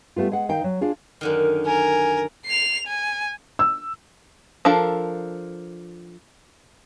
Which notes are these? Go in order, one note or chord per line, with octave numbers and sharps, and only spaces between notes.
G3 A3 B3 F4
G#3 F#5
D#3 D#4 F5 G5
F#3
D4 F4 G#4
F#2 D3 D#3
A#4 G#5
C7 F7
G#5
E6
F3 D4 A4 A#4 F5